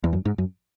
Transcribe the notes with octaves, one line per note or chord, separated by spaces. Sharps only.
E2
F#2
G#2
F#2